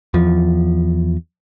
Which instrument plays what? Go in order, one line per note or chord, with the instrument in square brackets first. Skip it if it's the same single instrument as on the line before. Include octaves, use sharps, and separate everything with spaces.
[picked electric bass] E2 F3